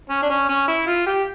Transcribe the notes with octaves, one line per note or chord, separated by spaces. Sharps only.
C#4
D4
C#4
C#4
E4
F4
G4